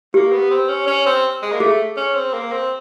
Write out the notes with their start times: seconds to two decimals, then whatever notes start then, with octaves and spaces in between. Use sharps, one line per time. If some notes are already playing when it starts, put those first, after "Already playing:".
0.14 A#3 G4
0.33 B3
0.51 C4
0.69 C#4
0.87 C#4
1.06 C4
1.42 G#3
1.52 A#3
1.60 A3 G#4
1.97 C#4
2.15 C4
2.33 A#3
2.52 C4